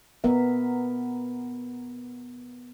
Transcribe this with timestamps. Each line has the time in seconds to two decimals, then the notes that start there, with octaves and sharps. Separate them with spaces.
0.24 B3 A#4 E5